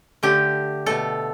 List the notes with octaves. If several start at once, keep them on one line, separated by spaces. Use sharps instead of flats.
D3 A3 G4
B2 A3 A4